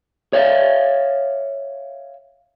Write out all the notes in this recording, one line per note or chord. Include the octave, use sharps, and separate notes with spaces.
C#5 E5 F5